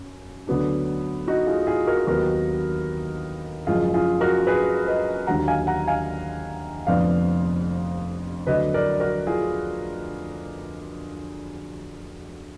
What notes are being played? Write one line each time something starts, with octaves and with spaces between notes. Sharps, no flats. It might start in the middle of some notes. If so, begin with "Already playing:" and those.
Already playing: F#2
D2 D3 F#3 B3 D4
D#4 F#4
F4 G#4
F4 G#4
F#4 A#4
D#2 D#3 F#3 B3 F#4 A#4
F#1 F#2 F3 G#3 F4 G#4
F4 G#4
F#4 A#4
G#4 B4
B4 D#5
D#2 D3 F#3 F#5 A#5
F5 G#5
F#5 A#5
F5 G#5
F1 F2 D3 F3 B3 D5 F5
D2 D3 F#3 D4 B4 D#5
A#4 D5
F#4 A#4
F4 G#4